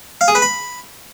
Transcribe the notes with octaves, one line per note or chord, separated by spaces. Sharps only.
F5
G#4
B4
B5